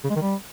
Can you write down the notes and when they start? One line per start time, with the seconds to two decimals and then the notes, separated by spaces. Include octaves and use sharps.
0.04 C#3
0.10 G#3
0.16 D#3
0.22 G3